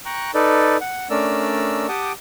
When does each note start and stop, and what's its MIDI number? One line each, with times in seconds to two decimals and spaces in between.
0.06 0.31 79
0.06 0.31 82
0.06 0.31 85
0.06 0.31 90
0.34 0.77 63
0.34 0.77 69
0.34 0.77 71
0.34 0.77 74
0.81 1.08 78
1.10 1.87 57
1.10 1.87 61
1.10 1.87 62
1.10 1.87 70
1.10 1.87 74
1.10 1.87 88
1.88 2.12 67
1.88 2.12 78
1.88 2.12 79
1.88 2.12 81
1.88 2.12 86
1.88 2.12 87